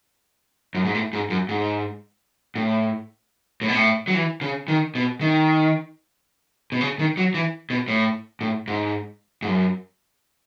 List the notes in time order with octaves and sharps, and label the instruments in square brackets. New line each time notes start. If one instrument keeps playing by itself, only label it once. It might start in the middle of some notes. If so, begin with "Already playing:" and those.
[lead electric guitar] F#2
G#2
A2
G#2
F#2
G#2
A2
A2
B2
A2
F#3
E3
C#3
D#3
B2
D#3
B2
C#3
D#3
F#3
E3
B2
A2
A2
G#2
G#2
F#2